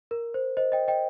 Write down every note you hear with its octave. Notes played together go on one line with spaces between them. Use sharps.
A#4
C5
C5 D#5
D#5 G5
D#5 G5